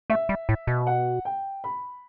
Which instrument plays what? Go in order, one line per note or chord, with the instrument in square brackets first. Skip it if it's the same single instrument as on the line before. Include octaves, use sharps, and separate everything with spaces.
[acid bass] A3 [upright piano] E5
[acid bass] G3
A2
B2
[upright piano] F#5
G5
B5